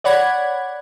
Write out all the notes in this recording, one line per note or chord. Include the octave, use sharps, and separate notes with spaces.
C#5 D5 F#5 B5 G#6